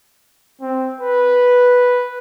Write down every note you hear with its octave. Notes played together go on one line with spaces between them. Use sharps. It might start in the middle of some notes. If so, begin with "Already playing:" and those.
C4
B4